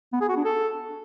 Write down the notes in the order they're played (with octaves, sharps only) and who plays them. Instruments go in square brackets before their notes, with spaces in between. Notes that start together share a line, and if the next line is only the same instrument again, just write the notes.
[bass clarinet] B3
G#4
F#4
D4
A4